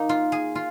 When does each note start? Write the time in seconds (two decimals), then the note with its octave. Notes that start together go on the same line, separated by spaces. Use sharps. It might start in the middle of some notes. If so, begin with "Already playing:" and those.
Already playing: A#3 D#4
0.09 F4
0.32 G#4
0.55 F4